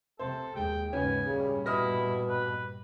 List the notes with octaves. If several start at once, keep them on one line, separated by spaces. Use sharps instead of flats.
C3 A4 C5
D#2 G#3 G5
D#2 G#2 C#3 B3 C#4 G#5
G2 A#2 C#3 G3
B2 E4 D#6 F6 A#6
B4